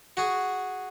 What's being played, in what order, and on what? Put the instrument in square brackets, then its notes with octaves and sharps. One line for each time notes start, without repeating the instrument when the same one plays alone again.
[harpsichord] F#4 G#4